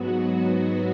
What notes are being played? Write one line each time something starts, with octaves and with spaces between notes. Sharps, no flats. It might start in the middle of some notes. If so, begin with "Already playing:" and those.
Already playing: G#2 F#3 B3 F#4